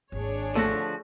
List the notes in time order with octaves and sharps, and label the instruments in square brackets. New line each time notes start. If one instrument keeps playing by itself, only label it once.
[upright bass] G#1 D#2 [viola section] D4 G#4 C#5
[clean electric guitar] D3 F3 F#4 [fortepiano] A3